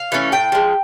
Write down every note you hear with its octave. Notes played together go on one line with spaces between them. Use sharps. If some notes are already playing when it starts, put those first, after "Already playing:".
Already playing: F5
E3 A3 C#4
A2 G5
F3 G#3